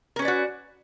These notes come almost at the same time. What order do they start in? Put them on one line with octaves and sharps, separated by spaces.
A#4 C#4 B4 D5 F#4